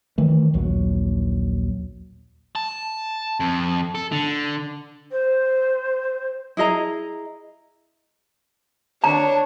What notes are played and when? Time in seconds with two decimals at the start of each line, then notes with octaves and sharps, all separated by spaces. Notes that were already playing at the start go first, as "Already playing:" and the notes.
0.18 D#3 E3 A3
0.54 A#1 D#2 F#3
2.55 A5
3.40 F2
3.95 A4
4.12 D3
5.11 C5
6.57 E4 G#4 D#5 A#5
9.04 D4 C#5 A#5